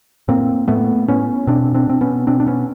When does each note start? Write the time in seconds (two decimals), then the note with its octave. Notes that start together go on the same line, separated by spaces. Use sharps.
0.28 A2 A#3 C4
0.68 A2 A3 B3
1.08 A2 B3 C#4
1.47 B2 C4 D4
1.74 C4 D4
1.87 B2 C4
2.01 B3 C#4
2.27 B2 C4 D4
2.40 D4
2.47 B3 C#4